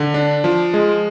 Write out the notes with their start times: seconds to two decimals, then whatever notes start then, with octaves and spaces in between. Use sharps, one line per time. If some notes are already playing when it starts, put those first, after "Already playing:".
Already playing: D3
0.14 D4
0.44 F3
0.74 G#3